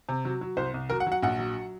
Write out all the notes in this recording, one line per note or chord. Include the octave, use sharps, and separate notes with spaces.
C3
F#3
F#3
C2 C5
C2
F#3 A#4
F#5
F#3
F#5
A#1 F#5
F#3